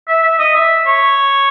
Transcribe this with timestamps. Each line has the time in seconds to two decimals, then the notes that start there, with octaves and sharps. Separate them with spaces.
0.08 E5
0.23 E5
0.39 D#5
0.55 E5
0.86 C#5